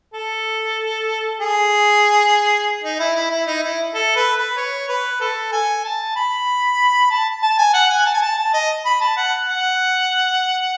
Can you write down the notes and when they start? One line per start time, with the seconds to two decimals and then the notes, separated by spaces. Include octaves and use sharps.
0.14 A4
1.40 G#4
2.83 D#4
2.99 E4
3.15 E4
3.31 E4
3.47 D#4
3.63 E4
3.94 A4
4.16 B4
4.36 B4
4.57 C#5
4.88 B4
5.20 A4
5.52 G#5
5.84 A5
6.16 B5
7.10 A5
7.43 A5
7.58 G#5
7.74 F#5
7.90 G#5
8.06 A5
8.14 G#5
8.22 A5
8.38 A5
8.53 D#5
8.85 B5
9.01 A5
9.17 F#5
9.48 F#5